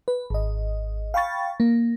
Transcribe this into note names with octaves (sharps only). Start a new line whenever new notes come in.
B4
G#1 D#5
F5 G5 B5 C#6 A6
A#3